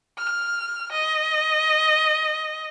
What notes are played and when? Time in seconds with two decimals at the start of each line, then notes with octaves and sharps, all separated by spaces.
0.18 F6
0.92 D#5